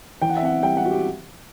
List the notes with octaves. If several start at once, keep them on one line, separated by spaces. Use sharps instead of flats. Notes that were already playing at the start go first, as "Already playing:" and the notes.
E3 G5
F#5
E5
C4 F#5
G3 G5
F#5
C4 F#4
G4